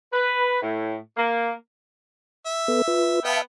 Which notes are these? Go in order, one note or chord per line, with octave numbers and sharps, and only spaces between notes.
B4
A2
A#3
E5
B3 A4 B4
F4 B4
B3 B4 E5 F5 G5 A5